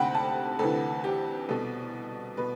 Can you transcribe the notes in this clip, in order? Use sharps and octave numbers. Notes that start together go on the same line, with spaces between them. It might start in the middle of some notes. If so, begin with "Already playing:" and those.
Already playing: D2 C3 F#5 G5 B5
A5
D2 C3 E3 A4
G4
C2 B2 A4
B2 B4